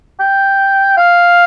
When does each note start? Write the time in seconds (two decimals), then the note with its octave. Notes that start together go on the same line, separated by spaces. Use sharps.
0.20 G5
0.97 F5